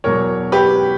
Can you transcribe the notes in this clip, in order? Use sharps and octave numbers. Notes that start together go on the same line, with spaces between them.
E2 B2 F#3 A#4 C#5
G4 B4